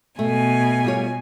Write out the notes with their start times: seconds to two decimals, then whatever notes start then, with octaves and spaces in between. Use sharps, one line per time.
0.19 B2 A3 G#5
0.84 G3 F4 C#5